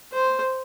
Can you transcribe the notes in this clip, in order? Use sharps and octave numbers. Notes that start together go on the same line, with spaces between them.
C5